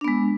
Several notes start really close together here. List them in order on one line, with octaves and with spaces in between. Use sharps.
D4 B3 G#3